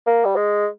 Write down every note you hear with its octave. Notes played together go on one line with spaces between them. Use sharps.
A#3
G3
G#3